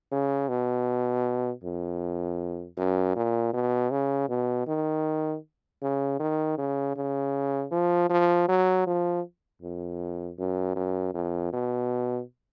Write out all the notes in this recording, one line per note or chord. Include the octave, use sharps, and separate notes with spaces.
C#3
B2
F2
F#2
A#2
B2
C#3
B2
D#3
C#3
D#3
C#3
C#3
F3
F3
F#3
F3
F2
F#2
F#2
F2
B2